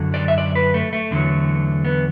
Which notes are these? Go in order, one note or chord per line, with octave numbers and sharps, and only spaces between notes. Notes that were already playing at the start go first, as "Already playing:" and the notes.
Already playing: F#2 D3 F#3
D5
E5
D5
B4
A3
A3
E2 D3 F#3
B3